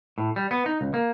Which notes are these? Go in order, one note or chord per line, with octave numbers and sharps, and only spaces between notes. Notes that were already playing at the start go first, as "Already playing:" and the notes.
A2
G3
B3
D#4
C#2
A#3